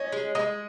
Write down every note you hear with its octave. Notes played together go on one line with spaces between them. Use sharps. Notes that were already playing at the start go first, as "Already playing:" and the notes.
Already playing: C#4 D#5
G#3
G#3 D#5